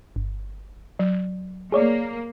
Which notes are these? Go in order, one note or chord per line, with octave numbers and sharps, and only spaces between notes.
G1
F#3
A#3 G#4 C#5 D5